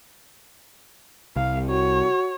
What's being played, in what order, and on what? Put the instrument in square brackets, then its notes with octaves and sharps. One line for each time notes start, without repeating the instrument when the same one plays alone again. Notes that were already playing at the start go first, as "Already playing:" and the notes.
[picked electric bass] C2 [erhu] F5
[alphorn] F#4 [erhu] C#5